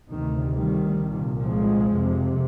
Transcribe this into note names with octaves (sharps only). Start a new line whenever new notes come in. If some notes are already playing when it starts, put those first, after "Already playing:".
D2 C3 D#3
D#3 G3
C2 A#2
F3 G#3
F2 C3